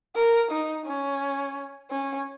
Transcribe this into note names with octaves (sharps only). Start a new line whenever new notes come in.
A#4
D#4
C#4
C#4